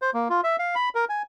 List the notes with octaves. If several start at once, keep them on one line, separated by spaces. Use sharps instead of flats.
C5
A#3
F4
E5
F5
B5
A#4
G#5